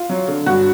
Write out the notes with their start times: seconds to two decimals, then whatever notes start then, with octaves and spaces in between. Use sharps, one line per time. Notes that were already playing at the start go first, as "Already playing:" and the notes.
Already playing: F4
0.10 F#3
0.28 D3
0.46 G2 F#4